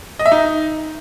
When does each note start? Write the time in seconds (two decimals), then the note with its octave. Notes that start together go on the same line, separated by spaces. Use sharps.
0.19 D#5
0.26 E5
0.32 D#4